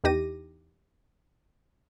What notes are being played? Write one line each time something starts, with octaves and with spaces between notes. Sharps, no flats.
E2 E3 D#4 G4 A#6 D#7